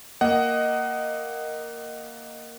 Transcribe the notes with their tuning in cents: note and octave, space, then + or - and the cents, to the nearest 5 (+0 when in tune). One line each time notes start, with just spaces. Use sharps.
A#3 +0 D#5 +0 F#5 +20